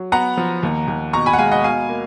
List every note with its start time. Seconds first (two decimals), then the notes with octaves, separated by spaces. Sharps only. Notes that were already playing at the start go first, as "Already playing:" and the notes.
Already playing: F#3
0.12 B3 F#5 A#5
0.37 F3
0.63 D#2
0.88 D#2
1.13 B2 A#5 C#6
1.26 G#5 B5
1.33 F#5
1.38 G#3 F5 G#5
1.52 D#5 F#5
1.64 B2 F5 G#5
1.89 A#3